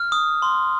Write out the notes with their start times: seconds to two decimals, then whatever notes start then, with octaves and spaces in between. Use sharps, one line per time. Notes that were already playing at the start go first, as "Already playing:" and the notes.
Already playing: F6
0.12 D#6
0.42 C6